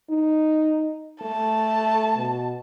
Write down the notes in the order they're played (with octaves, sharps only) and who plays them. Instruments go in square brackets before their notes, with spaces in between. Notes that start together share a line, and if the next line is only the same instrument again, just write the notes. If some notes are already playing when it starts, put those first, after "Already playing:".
[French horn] D#4
[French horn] A3 [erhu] A5
[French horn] B2